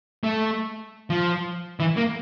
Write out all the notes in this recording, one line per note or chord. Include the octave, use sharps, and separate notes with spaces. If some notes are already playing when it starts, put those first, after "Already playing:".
A3
F3
E3
A#3